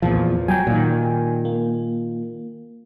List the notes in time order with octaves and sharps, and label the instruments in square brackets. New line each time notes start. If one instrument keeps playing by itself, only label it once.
[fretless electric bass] E2 A#2 F3
[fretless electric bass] F#3 [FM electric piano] G5 G#5
[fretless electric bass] A#2 D#3
[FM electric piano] A#3